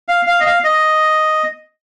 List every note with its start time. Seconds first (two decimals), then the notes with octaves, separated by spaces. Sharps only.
0.08 F5
0.27 F5
0.40 D#5
0.46 F5
0.64 D#5